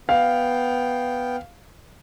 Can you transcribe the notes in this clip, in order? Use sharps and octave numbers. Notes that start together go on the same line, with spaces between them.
B3 F5 G5